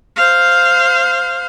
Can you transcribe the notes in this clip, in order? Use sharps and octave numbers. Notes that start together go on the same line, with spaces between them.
C5 F5